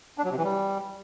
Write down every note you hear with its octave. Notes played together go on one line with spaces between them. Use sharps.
D4
F#3
C3
E3
G3